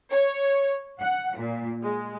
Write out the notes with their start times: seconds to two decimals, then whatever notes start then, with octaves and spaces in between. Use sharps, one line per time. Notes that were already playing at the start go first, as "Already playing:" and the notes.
0.10 C#5
1.00 F#5
1.38 A#2
1.82 G#3